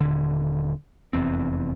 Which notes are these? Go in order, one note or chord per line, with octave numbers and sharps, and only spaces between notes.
D#1 D3
F1 E2 C4